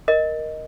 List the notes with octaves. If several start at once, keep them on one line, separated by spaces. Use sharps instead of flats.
A#4 D#5